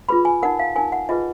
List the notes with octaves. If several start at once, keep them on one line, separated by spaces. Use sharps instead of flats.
F4 G#4 B4 B5
G#5
D#4 A#4 F#5
F5
D#4 A#4 G#5
F#5
F4 G#4 B4 D#5